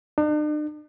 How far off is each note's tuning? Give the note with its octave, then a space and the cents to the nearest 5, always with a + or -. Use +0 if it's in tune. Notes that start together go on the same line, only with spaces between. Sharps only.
D4 +45